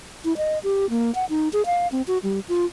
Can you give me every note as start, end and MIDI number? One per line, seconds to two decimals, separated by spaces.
0.25 0.36 64
0.37 0.59 75
0.64 0.89 67
0.90 1.13 58
1.15 1.25 78
1.30 1.49 63
1.53 1.65 68
1.66 1.87 77
1.92 2.02 60
2.08 2.18 66
2.23 2.40 55
2.49 2.65 65